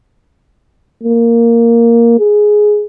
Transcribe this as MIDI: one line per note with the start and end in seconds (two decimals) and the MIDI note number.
1.04 2.15 58
2.19 2.86 68